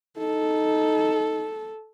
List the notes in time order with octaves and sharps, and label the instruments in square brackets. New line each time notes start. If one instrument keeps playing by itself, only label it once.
[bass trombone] D#4 [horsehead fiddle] A4